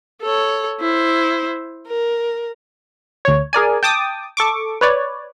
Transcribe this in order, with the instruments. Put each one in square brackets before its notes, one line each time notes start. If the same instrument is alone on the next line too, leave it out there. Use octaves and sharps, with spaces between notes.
[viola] A4 C#5
E4 C5
A#4
[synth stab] D2 C#5
G#4 A#4 D5 G#5
G5 A5 D6 D#6
A4 C#6 D6
B4 C#5 D5